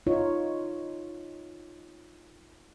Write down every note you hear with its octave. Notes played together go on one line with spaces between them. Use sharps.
D#4 F4 C#5